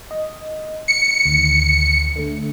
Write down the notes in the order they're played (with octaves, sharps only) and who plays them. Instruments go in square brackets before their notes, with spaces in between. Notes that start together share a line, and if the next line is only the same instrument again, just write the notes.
[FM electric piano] D#5
[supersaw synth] C#7
[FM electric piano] D2 D#3
D3 A3